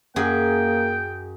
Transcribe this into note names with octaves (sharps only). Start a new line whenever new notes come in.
F#2 A#3 G#4 G5